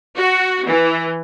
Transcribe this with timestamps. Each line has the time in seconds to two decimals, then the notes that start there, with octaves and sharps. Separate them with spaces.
0.17 F#4
0.66 E3